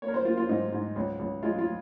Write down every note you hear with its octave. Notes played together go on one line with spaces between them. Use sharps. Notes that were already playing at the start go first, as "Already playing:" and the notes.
A#3 C#5
A#4
C5
A#3 F4
F4
G#2 D#4
G#2
C#2
C#2
G#3 F4
F4